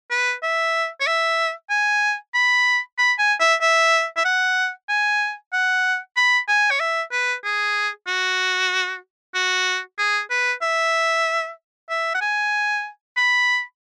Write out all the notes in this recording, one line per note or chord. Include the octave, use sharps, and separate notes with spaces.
B4
E5
C#5
E5
G#5
B5
B5
G#5
E5
E5
E5
F#5
G#5
F#5
B5
G#5
C#5
E5
B4
G#4
F#4
F#4
G#4
B4
E5
E5
F#5
G#5
B5